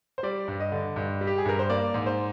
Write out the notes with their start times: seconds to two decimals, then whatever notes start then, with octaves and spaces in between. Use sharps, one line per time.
0.18 C5
0.23 G3 D5
0.48 G2
0.60 D#5
0.72 D3
0.96 G2
1.21 G3
1.27 G4
1.38 G#4
1.45 G2 A#4
1.59 C5
1.70 A#3 D5
1.94 G#2
2.06 C5